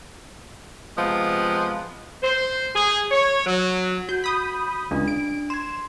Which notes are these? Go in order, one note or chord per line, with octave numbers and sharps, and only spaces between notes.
C3 F3 G#3 B3
C5
G#4
C#5
F#3
F#4 G6
B5 D#6 G6
C#2 D4
D7
C6 G#6 E7